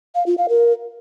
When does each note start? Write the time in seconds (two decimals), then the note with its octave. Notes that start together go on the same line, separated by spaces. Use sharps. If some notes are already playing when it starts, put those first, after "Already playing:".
0.15 F5
0.26 F4
0.38 F5
0.49 A#4